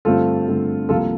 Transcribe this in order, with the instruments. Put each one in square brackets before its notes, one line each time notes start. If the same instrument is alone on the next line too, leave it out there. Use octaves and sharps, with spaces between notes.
[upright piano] G2 D3 A3 C4 F4 A4
G2 D3 A3 C4
C2 C3 F3 A#3 F4 A4